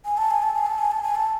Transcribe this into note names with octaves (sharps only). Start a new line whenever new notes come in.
G#5
A5
G#5
A5
G#5
A5
G#5
A5
G#5
A5